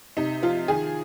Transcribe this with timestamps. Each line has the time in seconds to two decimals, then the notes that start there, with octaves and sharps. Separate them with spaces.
0.17 C3 D#4
0.43 F3 F4
0.68 D#3 G#4